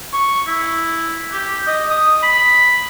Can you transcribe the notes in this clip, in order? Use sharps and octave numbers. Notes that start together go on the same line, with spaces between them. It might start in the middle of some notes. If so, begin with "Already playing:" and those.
C#6
E4
G4
D#5
D#6
B5